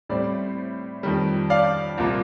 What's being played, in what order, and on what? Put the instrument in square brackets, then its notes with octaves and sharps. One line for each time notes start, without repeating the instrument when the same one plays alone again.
[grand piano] A2 G3 C4 D5
F2 D#3 G3
D5 F5
C2 A#2 F3 A#3